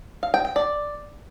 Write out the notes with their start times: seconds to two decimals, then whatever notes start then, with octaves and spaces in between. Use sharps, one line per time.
0.23 F5
0.34 G5
0.45 G5
0.56 D5